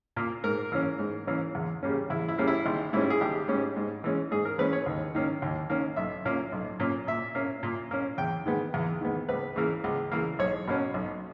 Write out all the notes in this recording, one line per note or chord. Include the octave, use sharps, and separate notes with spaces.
A#2 A#3
G#2 A#4
E3 A#3 C#4
G#2
E3 A#3 C#4
E2
C#3 G3 A#3 C#4
E2 E4
E4
C#3 G3 A#3 C#4
E4
G#1
G#2 G3 C#4 E4
G#4
G#1 G4
G#2 G3 C#4
G#2
E3 G#3 C#4
G#2 G#4
A#4
E3 G#3 C#4 B4
C#5
D#2
D#3 A#3 C#4
D#2
D#3 A#3 C#4
B1 E5
A#2 A#3 C#4
B1
A#2 A#3 C#4
A#2 E5
A#3 C#4
A#2
A#3 C#4
E2 G5
D#3 G#3 B3
E2
D#3 G#3 B3
C#2 B4
C#3 E3 A#3
C#2
C#3 E3 A#3
B1 C#5
B2 A#3 C#4
B1